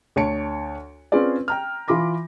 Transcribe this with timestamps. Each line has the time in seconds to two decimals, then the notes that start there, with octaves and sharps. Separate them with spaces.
0.16 D2 C#5 A5 C#7 D7
1.12 C4 C#4 F4 G#4 B4 D5
1.48 G5 A#5 F6
1.88 E3 F4 B5 D6 A#6